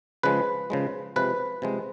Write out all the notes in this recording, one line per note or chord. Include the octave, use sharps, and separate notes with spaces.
C#3 F3 G#3 B4
C#3 F3 G#3
C3 F3 G#3 B4
C3 F3 G#3